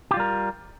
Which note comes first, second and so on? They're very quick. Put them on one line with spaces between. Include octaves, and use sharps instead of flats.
G4 F4 G3 A#4